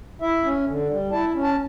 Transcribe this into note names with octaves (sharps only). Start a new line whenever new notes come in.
E4 E5
C#4
D3
G3
E4 A5
C#4
A5